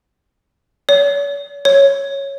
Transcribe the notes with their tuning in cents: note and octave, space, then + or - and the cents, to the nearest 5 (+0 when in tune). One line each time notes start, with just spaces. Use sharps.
C#5 +45
C#5 -5